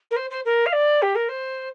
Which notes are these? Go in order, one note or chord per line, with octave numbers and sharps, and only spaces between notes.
A#4
C5
C5
A#4
F5
D5
G4
A#4
C5